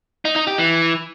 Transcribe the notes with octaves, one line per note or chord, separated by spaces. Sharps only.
D#4
D#4
G4
E3